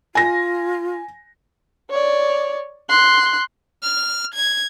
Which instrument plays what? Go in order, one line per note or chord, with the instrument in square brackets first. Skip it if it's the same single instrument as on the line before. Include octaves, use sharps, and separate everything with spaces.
[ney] F4 [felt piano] G#5 A#6
[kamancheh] C#5 D5
C6 F#6
[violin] F6
G#6